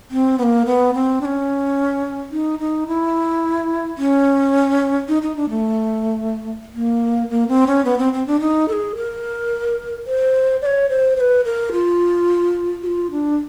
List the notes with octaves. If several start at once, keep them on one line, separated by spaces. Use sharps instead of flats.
C4
B3
A#3
B3
C4
D4
C#4
D#4
D#4
E4
C#4
D#4
D#4
D4
A3
A#3
A#3
C4
C#4
B3
C4
C4
D4
D#4
A4
G#4
A#4
C5
D5
C#5
C5
C5
B4
A#4
F4
F#4
F4
D4